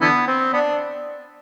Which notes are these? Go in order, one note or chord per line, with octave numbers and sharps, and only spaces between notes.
D3 E3 B3
C4
B3 D4